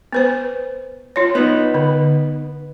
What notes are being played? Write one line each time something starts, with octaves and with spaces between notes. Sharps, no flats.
B3 B4 C5
F4 C#5
B3 D#4
D3